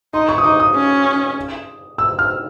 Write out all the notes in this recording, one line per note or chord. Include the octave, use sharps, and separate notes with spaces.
D#4 C6
C#6
D#6
D#4 D6
D#6
C#4
E6
F6